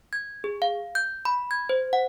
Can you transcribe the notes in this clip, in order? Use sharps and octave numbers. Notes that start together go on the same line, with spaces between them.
G#6
G#4
F5
G6
B5
G#6
C5
F#5